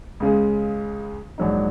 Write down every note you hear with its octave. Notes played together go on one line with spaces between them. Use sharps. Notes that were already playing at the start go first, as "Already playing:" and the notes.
C#2 C#3 G#3
A#1 G#2 F#3 D#4